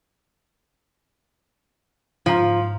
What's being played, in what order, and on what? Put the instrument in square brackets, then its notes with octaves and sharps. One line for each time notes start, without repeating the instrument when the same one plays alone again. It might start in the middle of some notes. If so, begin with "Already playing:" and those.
[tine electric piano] G#2 [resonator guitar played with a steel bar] F3 [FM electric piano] F5 A#5